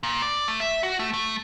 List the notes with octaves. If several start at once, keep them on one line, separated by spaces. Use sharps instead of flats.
A#2
D5
A3
E5
F#4
A3
A3